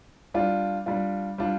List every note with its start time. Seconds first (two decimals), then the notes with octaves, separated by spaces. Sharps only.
0.34 G3 D4 F4
0.86 G3 D4 F4
1.38 G3 D4 F4